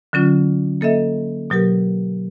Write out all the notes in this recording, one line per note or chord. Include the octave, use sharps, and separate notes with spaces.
D3 F#3 C#4 F4
A#3 A4 D#5 E5
B2 F#3 G4 A#4